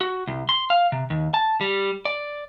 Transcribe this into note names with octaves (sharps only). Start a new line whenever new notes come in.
F#4
C2
C6
F5
C3
D#2
A5
G3
D5